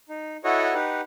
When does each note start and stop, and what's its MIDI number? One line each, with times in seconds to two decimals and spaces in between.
0.09 0.37 63
0.44 0.74 64
0.44 0.74 66
0.44 0.74 69
0.44 0.74 73
0.44 0.74 75
0.44 0.74 78
0.74 1.01 63
0.74 1.01 67
0.74 1.01 71
0.74 1.01 78